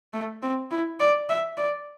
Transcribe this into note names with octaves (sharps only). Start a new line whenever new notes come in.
A3
C4
E4
D5
E5
D5